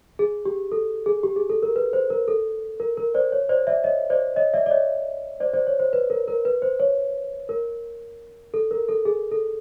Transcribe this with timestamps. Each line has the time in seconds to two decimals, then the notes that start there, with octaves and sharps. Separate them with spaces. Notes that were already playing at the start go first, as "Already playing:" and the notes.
0.19 G#4
0.45 G4
0.72 A4
1.06 G#4
1.23 G4
1.36 G#4
1.49 A4
1.63 A#4
1.76 B4
1.93 C5
2.10 A#4
2.28 A4
2.80 A#4
2.97 A#4
3.15 C5 D5
3.32 C#5
3.49 C5 D5
3.67 D5 E5
3.84 C#5 D#5
4.10 C5 D5
4.36 C#5 D#5
4.54 D5 E5
4.66 D5
4.71 C#5 D#5
5.40 C5 D5
5.53 C5 D5
5.67 C#5
5.80 C5
5.93 B4
6.10 A#4
6.28 A#4
6.45 B4
6.62 C5
6.80 C#5
7.49 A#4
8.54 A4
8.71 A#4
8.89 A4
9.05 G#4
9.31 A4